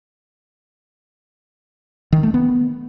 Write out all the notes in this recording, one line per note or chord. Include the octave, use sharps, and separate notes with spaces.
D#3
A3
B3